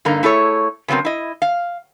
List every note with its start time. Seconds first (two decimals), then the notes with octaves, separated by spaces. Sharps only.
0.05 G2 D3 A#3 D#4 A#5
0.23 A3 E4 G#4 A4 C#5
0.88 C#3 F#3 B3 C4 A#4
1.05 E4 D#5
1.42 F5